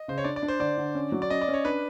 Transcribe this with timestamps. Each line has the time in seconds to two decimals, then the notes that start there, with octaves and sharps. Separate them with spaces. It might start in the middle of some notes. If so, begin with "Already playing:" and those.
Already playing: D#5
0.08 C#3 C5
0.18 C#5
0.24 D4 D5
0.36 D5
0.42 D4
0.48 C5
0.60 D3 D5
0.77 D3
0.95 C#4
1.12 F#3
1.22 D5
1.30 C#4 D#5
1.42 D5
1.48 C#4
1.54 C#5
1.65 D4 B4